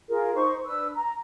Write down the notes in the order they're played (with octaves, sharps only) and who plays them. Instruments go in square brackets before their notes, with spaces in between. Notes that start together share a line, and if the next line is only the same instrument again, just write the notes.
[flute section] F4 G#4 A#4
D#4 C5 C#6
D4 B4 E6
A#5